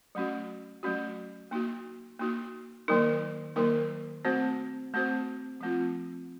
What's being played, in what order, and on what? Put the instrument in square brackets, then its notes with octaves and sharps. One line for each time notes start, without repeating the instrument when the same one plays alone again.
[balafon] F#3 A3 C#4 F#4
F#3 A3 C#4 F#4
A#3 D#4 F#4
A#3 D#4 F#4
D#3 F#3 A#3 D#4 A#4
D#3 F#3 A#3 D#4 A#4
A3 C4 F#4 C5
A3 C4 F#4 C5
F3 A3 C4 F4